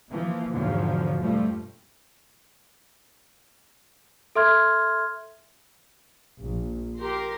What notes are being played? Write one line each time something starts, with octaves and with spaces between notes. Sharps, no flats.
E3 F3 A#3
E2 G#2 B2 D3 F3 F#3
G2 F3 G3 A3
A4 E5 C6 F6 G#6
A#1
G4 A#4 C6